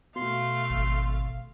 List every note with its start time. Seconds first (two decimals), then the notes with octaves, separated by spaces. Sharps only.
0.16 B2 A3 F5 C6
0.70 G#1